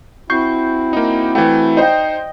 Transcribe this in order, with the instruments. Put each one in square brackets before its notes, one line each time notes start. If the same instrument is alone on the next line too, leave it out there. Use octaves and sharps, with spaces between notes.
[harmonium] C4 E4 F#4 [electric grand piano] C#6 G6 C7
[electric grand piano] A#3 D#4
[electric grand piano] E3 A3 [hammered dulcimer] G5
[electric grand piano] D#4 C5 [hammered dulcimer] D#5 G5